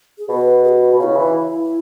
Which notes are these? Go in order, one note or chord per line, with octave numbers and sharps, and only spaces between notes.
G#4
B2 B4
G#4
F#4
B2
C#3 E4 F#4
E3